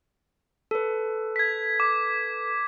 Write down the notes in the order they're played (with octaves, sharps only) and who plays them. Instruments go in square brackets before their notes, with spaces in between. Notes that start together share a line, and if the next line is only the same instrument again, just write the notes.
[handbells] A4 B4
[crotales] G#6 B6
D6